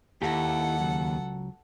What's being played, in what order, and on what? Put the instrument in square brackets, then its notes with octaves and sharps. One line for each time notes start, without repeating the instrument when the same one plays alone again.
[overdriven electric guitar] D#2 [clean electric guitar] E4 G4 [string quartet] A4 F#5
[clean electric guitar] C#2 F#3